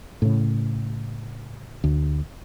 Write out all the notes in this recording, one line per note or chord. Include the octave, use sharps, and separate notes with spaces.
A2 C#3
D2